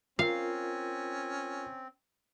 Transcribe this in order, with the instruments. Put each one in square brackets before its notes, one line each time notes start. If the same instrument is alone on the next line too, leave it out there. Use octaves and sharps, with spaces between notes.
[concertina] C4 [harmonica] C#4 [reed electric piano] F4 A#4 [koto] F5